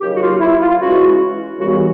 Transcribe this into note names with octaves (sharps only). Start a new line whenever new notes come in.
D#2 C#3 F#3 G4
F#4
F4
E4
F4
C#3 E3 G#3 C#4 E4 F#4
D#2 C#3 E3 G3 B3 F#4